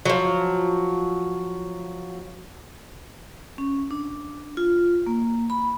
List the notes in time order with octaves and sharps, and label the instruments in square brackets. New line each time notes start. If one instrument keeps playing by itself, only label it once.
[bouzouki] F3 F#3
[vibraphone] C#4
D4
F4
A#3
B5